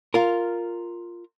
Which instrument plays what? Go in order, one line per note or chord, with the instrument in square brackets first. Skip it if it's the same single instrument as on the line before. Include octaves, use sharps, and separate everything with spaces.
[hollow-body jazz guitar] F4 A#4